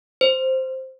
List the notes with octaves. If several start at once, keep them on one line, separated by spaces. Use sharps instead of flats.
C5